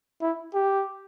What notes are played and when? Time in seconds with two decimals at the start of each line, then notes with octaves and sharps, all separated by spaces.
0.22 E4
0.55 G4